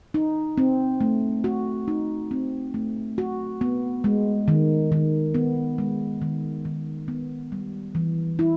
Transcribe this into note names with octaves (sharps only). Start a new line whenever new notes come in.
D#4
C4
A3
F#4
D#4
C4
A3
F#4
B3
G#3
D#3
D#3
B3
G#3
D#3
D#3
B3
G3
E3
E4